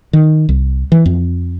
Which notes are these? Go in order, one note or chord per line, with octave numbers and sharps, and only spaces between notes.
D#3
C2
E3
F2